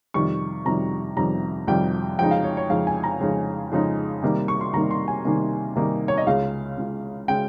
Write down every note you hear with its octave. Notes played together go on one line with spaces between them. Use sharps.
F2 C3 D#3 G3 C#6
F2 C3 D#3 G3 A#5
F2 C3 D#3 G3 A#5
F2 C3 D#3 G3 G5
F2 C#3 G#3 D#4 G5
F5
C#5
C#5
F2 C#3 G#3 D#4 F5
G#5
A#5
F2 C#3 G#3 D#4
F2 C#3 G#3 D#4
C3 D#3 G3 A#3 D#4
C#6
C6
C3 D#3 G3 A#3 D#4 A#5
C6
G#5
C3 D#3 G3 A#3 D#4
C3 D#3 G3 A#3 D#4
C#5
D#5
C#2 C#3 G#3 F5
C#2 C#3 G#3
C#3 G#3 G5